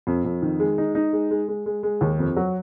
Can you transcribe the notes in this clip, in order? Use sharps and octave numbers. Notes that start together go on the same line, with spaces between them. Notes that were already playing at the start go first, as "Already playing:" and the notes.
F2
F2
D#3
G#3
D#4
D#4
G#3
G#3
G#3
G#3
G#3
D#2
F2
F#3